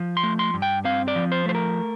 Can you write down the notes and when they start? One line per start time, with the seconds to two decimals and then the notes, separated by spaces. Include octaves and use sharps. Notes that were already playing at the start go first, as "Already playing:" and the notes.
Already playing: F3
0.17 C6
0.23 A3
0.39 C6
0.54 G2
0.62 G5
0.85 C4 F5
1.08 D5
1.16 F3
1.32 C5
1.46 A3 C5
1.55 A#4